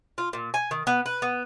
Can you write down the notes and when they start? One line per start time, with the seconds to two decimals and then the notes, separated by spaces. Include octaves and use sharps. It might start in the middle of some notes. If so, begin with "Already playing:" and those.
0.18 F4
0.33 A#2
0.54 G#5
0.71 D#3
0.87 B3
1.06 B4
1.22 B3